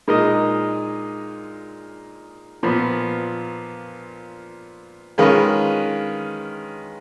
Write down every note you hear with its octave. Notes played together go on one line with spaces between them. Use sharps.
A#2 G#3 D#4 A#4 D#5
A#2 F3 B3
D#3 G#3 C#4 F4 B4